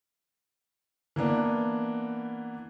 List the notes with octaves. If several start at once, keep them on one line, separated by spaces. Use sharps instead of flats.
E3 A#3 B3 D4